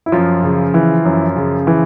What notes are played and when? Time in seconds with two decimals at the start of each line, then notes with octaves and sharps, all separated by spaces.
0.06 E4
0.12 F#2 F3 F4
0.43 C#3
0.74 E3
1.05 F#2
1.36 C#3
1.67 E3